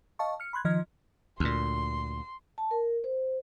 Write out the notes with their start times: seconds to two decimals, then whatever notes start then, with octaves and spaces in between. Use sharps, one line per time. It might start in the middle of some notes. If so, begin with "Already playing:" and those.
0.19 D#5 F5 A5 C#6
0.40 F6 C#7
0.53 B5 C6 F#6 G#6
0.65 D#3 F3 D#5 F6 G#6
1.40 D2 A#2 C6
2.58 A5
2.71 A#4
3.04 C5